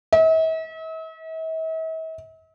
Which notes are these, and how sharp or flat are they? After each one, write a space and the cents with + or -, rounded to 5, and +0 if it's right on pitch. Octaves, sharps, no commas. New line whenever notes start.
E5 -45